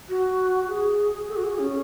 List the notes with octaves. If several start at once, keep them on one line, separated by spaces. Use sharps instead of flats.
F#4
G#4
A4
F#4
G#4
C#4